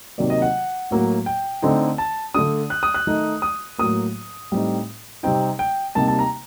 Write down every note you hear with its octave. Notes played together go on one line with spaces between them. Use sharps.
C3 D#3 F#3 A#3 D5
D#5
F#5
A2 F#3 A#3
G5
D3 A3 C4 D#4
A5
D3 A3 D4 D#6
F#6
D#6
F#6
D#3 A3 D#4
D#6
A2 F#3 A#3 D#6
A2 G3 C4 D#4
C3 G3 C4 D#4 G5
G5
C3 G3 A#3 D#4 A5
A5
A#5